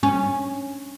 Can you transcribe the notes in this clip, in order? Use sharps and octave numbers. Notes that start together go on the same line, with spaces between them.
C#4